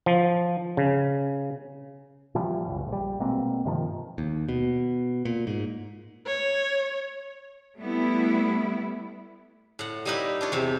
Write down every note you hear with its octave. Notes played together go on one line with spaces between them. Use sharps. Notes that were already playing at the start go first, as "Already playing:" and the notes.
F3
C#3
A#2 E3 F3 G3
F#1 C#2
A#1 G3
B2 G#3 A#3 C4
G2 C3 D#3 F3
D#2
B2
A#2
G#2
C#5
G3 A3 B3 E4
A2 F#5
G3 A#3 D#4 E4 B4
D4 F4 C#5
E2 C3